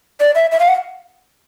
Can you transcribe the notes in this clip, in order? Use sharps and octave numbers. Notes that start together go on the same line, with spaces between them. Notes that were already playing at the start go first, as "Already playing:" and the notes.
D5
E5
E5
F5
F#5